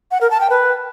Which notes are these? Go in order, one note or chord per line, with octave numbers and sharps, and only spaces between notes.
F#5
A#4
A5
G5
B4